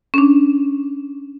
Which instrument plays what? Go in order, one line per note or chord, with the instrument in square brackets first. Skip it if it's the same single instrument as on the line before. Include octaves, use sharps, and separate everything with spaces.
[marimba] C#4 D4